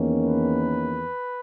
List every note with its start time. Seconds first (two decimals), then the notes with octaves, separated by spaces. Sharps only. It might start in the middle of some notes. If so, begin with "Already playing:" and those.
Already playing: E2 D#3 A#3 C#4
0.26 B4